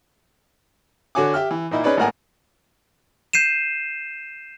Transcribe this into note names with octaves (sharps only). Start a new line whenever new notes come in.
D3 F#4 C#5 G#5 D6
G4 E5 G5 F6
E3
A#2 A#3 D#4 E4
C#4 D#4 G#4 B4 C#5 D5
G#1 A2 A#3 A#4 F#5 G#5
G6 C7 D#7 E7